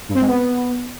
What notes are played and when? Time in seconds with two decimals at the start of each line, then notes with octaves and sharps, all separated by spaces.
0.09 G2
0.15 C4
0.21 G#3
0.27 B3